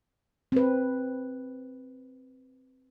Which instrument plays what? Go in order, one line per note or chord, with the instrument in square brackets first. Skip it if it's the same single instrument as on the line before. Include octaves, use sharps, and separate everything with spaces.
[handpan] C4 B4